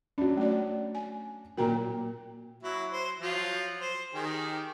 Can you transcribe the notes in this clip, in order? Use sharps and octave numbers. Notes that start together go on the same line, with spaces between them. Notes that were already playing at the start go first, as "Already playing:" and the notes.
F#3 C#4 D4
A3 D5
G#5
A#2 F#3 A#4 G5 A#5
F#3 E4
C5
F3 F#3 F4
C5
D#3 G4 G#4